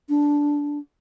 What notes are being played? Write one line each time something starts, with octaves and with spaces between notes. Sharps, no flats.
D4